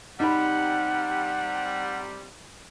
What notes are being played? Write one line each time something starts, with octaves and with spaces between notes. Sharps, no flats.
C3 G3 D#4 F#5 B5